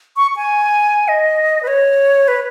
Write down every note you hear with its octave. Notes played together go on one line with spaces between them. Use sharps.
C#6
G#5
D#5
B4
C#5
B4